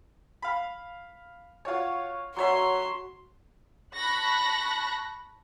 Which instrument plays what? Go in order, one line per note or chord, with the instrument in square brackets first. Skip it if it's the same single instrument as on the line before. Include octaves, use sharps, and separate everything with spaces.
[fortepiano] F5 B5
F4 F#4 C#5
[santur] F#3 E5 [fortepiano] F#4 C#5 [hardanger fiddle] C6
[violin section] A5 B5 C#6 F#6 A#6